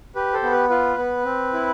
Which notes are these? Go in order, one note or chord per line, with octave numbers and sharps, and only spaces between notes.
G4 B4
A4 C5
B3
B4
F4 B4
B3
C4
E4